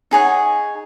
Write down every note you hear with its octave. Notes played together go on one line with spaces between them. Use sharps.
D#4 G#4 C#5 F#5